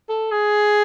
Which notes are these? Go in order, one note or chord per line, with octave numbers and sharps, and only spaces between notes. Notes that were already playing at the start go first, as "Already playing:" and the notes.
A4
G#4